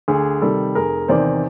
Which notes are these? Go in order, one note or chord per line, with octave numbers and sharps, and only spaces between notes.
D2 G#4
C3 D#3 G3 A4
F1 G#4 A#4
E2 C3 D#3 C5 D5